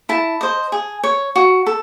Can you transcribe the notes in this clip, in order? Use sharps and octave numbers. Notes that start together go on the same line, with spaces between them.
E4 A5
C5 D#5
G#4
C#5
F#4
A4